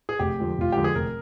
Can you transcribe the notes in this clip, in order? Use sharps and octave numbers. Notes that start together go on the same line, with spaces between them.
G#4
F1 G4
F2 D3 G#3
F1 F4
F2 D3 G#3 G4
G#4
F1 A#4